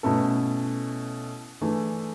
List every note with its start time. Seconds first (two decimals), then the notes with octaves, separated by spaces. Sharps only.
0.03 B2 A3 C#4 E4 A4
1.61 E3 A3 D4 G#4